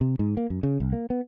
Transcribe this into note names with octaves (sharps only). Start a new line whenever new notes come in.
C3
G#2
A#3
F#2
C#3
C2
A#3
B3